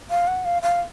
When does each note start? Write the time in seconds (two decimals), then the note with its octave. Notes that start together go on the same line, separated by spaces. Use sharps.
0.10 F5
0.28 F#5
0.45 F5
0.62 F5